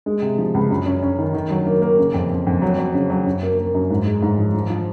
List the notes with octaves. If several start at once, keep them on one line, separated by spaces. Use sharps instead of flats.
G#3
C3
F3
C#2
F#2
C#4
C#4
D#3
D#3
F#3
A#3
A#3
C#3
F2
F2
F2
F#3
F#3
C#3
F#3
F#2
A#3
A#3
F#2
G#2
G#3
G#2
F3
F3
F3